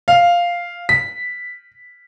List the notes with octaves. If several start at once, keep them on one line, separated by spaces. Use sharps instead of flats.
F5
B6